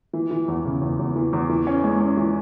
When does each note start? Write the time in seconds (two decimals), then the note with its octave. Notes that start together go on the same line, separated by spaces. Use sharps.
0.13 E3
0.31 E3
0.48 E2
0.65 C#3
0.81 E2
0.99 E2
1.16 E3
1.33 E2
1.50 E3
1.67 C#4
1.84 G#3
2.01 C#4
2.17 E3